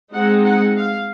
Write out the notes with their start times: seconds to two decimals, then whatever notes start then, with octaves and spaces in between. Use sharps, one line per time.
0.13 G#3 C4 D#4 F#5
0.45 F#5
0.76 F5